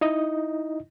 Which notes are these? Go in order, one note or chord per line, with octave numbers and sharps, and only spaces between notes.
D#4 E4 D#5